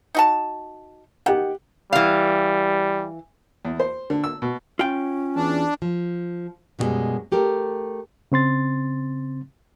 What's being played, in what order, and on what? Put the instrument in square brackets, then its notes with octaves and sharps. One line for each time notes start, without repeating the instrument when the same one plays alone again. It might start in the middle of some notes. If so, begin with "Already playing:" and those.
[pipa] D#4 F#4 A5
[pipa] D#3 [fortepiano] G4 F#5
[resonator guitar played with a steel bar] E3 F5 [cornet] G3
[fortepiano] E2
C5
D3
E6
B2
[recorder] C#4 [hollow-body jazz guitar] F4 G5
[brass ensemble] E2 [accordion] D4
[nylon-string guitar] F3
F#2 B2 D3 G3 G#3
A3 G4 A4 A#4
[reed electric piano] C#3 C4 C6 A6